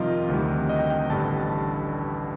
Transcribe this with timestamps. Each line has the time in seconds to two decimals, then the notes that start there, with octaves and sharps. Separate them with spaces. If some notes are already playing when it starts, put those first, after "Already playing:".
Already playing: F2 C3 D#3 G3 F4 A#4 D#5
0.28 D2 C3 D#3 G3
0.69 D#5
0.79 G5
0.90 G5
1.00 G5
1.10 A1 G2 D3 G3 A5